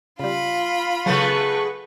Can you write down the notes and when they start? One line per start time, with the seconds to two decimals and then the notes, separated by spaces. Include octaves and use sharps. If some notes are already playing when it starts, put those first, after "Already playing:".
0.19 C#3 G3 F4 B5
1.06 C#3 F#3 G#3 A3 B3 B4 C#6